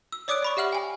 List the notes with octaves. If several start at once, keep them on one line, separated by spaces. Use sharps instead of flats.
E6
C#5 D5 D6 D#6 F#6 D7
D5 B5 C#6
G4 E5 F#5 F6 F#7
G5 G#5